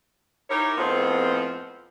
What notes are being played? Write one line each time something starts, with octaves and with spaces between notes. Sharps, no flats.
D#4 E4 G4 A#4 C#5
F2 A2 F3 G#3 B3 C4